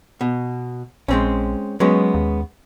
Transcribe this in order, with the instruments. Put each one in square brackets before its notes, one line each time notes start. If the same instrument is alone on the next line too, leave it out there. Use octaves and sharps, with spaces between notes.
[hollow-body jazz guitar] B2
[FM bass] A#1 [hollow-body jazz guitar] G#3 C4 C#4
[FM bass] F#3 [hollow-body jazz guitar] G#3 B3 C#4
[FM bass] D#2